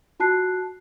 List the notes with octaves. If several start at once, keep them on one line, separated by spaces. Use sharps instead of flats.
F4 F#4 A5 F#6 C7